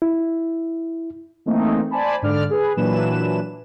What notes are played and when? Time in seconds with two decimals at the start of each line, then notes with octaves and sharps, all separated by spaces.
0.02 E4
1.46 E3 A3 A#3 C4 D#4
1.91 C5 D5 G#5 A5 B5
2.22 G#2 D3 D5 F6
2.50 G#4 B4
2.77 A#2 E3 F#3 D4 B4 E7